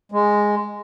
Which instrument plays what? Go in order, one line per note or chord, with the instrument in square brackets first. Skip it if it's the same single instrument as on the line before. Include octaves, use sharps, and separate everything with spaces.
[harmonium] G#3